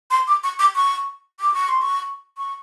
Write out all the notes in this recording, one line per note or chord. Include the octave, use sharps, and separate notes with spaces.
C6
D6
C#6
D6
C#6
D6
C#6
C6
C#6
C#6